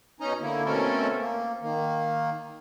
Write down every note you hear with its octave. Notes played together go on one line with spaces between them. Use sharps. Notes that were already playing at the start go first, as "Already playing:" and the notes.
B2 C#4 D#4 D#5 A#5
D3 A#3 E4
B2 A3 C4 C#4 A4 A#4
A#3
D#3 A#3